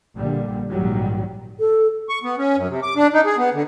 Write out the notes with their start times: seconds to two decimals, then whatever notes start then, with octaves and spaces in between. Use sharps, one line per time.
0.16 A#1 A#2 D3 G3
0.69 A#1 G#2 D#3 F#3 G3
1.60 A4
2.09 C#6
2.23 B3
2.38 C#4
2.57 F#2
2.68 C3
2.83 D6
2.96 D4
3.13 D#4
3.25 G#4
3.38 B3
3.54 D3